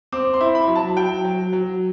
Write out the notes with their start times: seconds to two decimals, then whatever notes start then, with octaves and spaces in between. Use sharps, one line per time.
0.12 C4 D6
0.34 C6
0.41 E4
0.55 B5
0.68 F#3
0.76 A5
0.97 F#3 G5
1.25 F#3
1.53 F#3